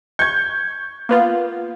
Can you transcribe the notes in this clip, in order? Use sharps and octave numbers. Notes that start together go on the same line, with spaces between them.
C#6 G6 G#6
A#3 B3 F4